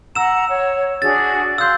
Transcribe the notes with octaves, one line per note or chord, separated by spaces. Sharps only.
F#5 A#5 E6 E7
C#5
D4 F#4 G#4 A6
F5 C6 E6 F#6 G6